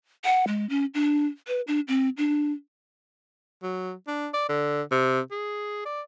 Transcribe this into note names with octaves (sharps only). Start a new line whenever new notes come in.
F#5
G#3
C#4
D4
B4
D4
C4
D4
F#3
D4
D5
D3
C3
G#4
D5